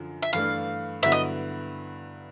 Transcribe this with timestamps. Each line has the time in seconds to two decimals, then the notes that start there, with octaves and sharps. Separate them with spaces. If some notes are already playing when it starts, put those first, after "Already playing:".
Already playing: F#2 D3 F3
0.22 E5
0.33 G2 E3 A3 D4 F5
1.02 G2 D3 F#3 B3 E4 E5
1.12 D#5